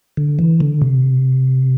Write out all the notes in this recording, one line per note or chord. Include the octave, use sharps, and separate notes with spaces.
D3
E3
D3
C3